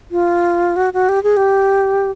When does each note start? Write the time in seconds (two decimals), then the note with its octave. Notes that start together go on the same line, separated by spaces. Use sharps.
0.11 F4
0.76 F#4
0.93 F#4
1.09 G4
1.23 G#4
1.37 G4